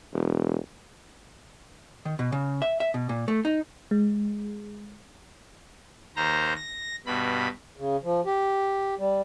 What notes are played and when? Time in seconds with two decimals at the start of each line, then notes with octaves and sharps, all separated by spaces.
0.13 E1
2.05 D#3
2.19 B2
2.32 C#3
2.62 E5
2.80 E5
2.94 B2
3.09 A#2
3.28 A3
3.45 D#4
3.91 G#3
6.16 D#2 C5 A#5
6.56 A#6
7.06 G2 B2 B5
7.77 C#3
8.03 F3
8.26 G4
8.99 G3